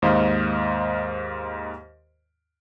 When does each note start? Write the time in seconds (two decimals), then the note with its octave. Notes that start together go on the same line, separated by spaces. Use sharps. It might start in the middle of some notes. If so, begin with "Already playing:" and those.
0.02 D#2 G#2 C5 D#5 F5